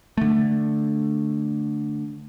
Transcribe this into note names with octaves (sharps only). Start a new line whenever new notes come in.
D3 A3